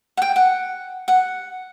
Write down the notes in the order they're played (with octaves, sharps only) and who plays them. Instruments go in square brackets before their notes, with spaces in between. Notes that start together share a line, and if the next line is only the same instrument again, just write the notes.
[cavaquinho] F#5
G5
F#5
F#5